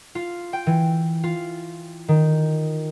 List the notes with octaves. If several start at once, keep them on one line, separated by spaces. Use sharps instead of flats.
F4
G5
E3
F4
D#3